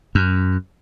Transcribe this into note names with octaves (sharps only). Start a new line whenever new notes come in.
F#2